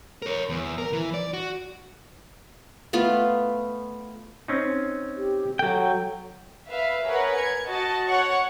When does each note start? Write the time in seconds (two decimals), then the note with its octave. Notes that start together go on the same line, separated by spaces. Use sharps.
0.22 A#4 C#5
0.49 E2
0.78 A#4
0.93 E3
1.14 D5
1.33 F#4
2.93 A3 B3 F4 B4
4.48 C4 C#4 D#4
5.17 G4
5.59 F#3 A4 G5
6.68 B4 E5 F5
7.05 G#4 A#4 B4 C#5 F#5
7.37 G#6 C#7
7.68 F#4 D#5 A5
8.07 C#5 F#5 C#6